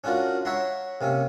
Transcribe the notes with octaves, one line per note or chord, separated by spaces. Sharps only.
C#4 D4 F4 F#4 A#4
C#5 E5 F#5 A#5 C6
C3 A#3 C#4